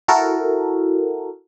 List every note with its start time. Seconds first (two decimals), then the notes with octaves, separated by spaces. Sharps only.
0.08 E4 F#4 A4 A#4